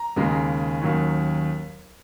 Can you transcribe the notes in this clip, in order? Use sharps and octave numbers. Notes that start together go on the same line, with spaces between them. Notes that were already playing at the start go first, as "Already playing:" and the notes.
Already playing: A#5
D#2 C#3 G#3
D#2 D#3 F#3 C#4